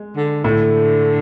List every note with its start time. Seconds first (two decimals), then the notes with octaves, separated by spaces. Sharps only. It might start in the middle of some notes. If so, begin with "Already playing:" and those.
Already playing: G#3
0.16 D3
0.44 A2 D3 A3